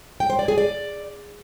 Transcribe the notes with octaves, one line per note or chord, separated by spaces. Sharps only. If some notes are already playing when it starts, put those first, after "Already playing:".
G5
C5
D5
G#4
D5